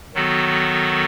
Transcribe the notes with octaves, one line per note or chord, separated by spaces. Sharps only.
D#3 F#3 B3 F#4 A4